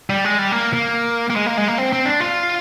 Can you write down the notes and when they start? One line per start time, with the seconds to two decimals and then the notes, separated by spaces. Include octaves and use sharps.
0.10 G3
0.25 G#3
0.39 G3
0.52 A#3
0.73 A#3
1.30 A#3
1.36 G#3
1.46 A#3
1.57 G#3
1.68 A#3
1.78 C4
1.93 C4
2.06 D4
2.20 F4